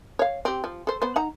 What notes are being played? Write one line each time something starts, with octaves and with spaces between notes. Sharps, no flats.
C#5 F5
C4 G4
F3
A4 C5
B3 C5
D#4 F#5 A#5